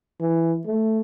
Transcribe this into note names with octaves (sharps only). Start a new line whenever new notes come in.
E3
A3